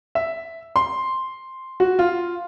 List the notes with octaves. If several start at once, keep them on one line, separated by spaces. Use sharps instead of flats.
E5
C6
F#4
F4